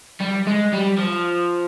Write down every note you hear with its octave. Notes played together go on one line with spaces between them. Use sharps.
G3
G#3
G3
F3